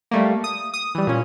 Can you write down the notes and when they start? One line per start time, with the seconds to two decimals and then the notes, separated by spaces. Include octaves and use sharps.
0.11 G3 A3 A#3
0.44 D#6
0.74 D#6
0.95 E3 G3
1.07 A#2 C#4